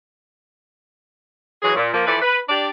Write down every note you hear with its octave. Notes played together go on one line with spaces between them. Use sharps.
E3 F#3 G#4
A#2
F3 A#3
E3 F3 E4 A4 B4 D5
B4
D4 G4 D5